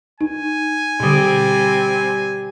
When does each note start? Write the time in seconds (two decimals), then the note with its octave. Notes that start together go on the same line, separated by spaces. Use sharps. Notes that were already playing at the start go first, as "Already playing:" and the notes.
0.21 D#4 G#5
1.00 B2 D3 G3 C4